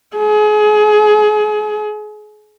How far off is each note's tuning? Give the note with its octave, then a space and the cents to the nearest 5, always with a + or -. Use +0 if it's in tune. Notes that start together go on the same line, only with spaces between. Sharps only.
G#4 +30